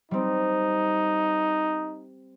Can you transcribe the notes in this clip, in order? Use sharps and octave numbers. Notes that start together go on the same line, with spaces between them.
G3 C4 D#4